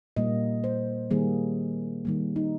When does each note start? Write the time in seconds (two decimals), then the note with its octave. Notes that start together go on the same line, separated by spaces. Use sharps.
0.16 A#2 G3 A#3 D#5
0.64 C5
1.11 D#3 G3 A#3 G#4
2.05 D#3 G3 A#3
2.36 D#4